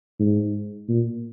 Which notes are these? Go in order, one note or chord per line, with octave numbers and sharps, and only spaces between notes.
G#2
A#2